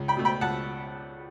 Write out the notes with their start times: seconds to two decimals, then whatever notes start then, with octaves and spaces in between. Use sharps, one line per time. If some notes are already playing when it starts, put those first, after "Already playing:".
Already playing: C#2
0.08 G5 B5
0.17 B2 A3
0.25 G5 B5
0.41 C#2 F#5 A5